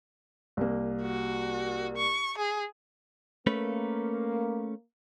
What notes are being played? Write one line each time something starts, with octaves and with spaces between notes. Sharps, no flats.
C2 A#3
F#4
C#6
G#4
A3 A#3 C#4 B4